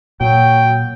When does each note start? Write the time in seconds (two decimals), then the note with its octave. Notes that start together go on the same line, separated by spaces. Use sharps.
0.21 A#2 F#3 G5